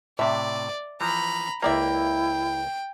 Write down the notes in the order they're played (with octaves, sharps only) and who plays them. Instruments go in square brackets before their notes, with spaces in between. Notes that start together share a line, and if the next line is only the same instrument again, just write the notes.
[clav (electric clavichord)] A2 C3 [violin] D5 [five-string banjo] E5
[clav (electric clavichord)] E3 F3 [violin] A#5 B5
[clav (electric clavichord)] C#2 A#3 [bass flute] E4 [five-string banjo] A#4 D5 E5 [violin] G5